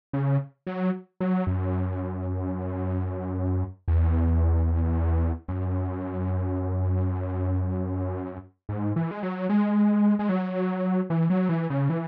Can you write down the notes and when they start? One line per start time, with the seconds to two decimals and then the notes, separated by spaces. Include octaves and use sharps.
0.13 C#3
0.67 F#3
1.20 F#3
1.47 F#2
3.88 E2
5.48 F#2
8.69 G#2
8.96 E3
9.11 G#3
9.23 F#3
9.49 G#3
10.19 G#3
10.29 F#3
11.10 E3
11.30 F#3
11.49 E3
11.70 C#3
11.90 E3